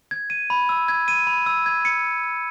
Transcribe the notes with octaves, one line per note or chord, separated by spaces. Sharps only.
G#6
D#7
B5
E6
G#6
D#7
B5
E6
G#6
C#7